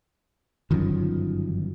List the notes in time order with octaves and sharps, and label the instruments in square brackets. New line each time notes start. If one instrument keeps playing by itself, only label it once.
[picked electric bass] G1 F#2 [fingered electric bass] D#3 F3